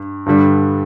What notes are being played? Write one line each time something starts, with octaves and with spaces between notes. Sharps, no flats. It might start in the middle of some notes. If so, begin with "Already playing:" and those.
Already playing: G2
G2 D3 G3